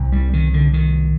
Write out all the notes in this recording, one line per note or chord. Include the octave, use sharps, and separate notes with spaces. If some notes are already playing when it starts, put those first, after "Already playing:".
Already playing: C2 C3
G3
D#3
D3
D#3